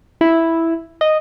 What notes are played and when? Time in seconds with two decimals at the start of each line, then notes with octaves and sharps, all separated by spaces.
0.21 E4
1.01 D#5